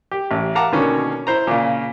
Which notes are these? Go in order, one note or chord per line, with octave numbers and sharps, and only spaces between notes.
G4
A1
F5 F#5 A5 A#5 D6
B2 D3 D#3 A#3 C#4
E4 C5 A#5
A#2 C#3